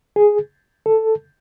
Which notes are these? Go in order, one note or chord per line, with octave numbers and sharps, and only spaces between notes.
G#4
A4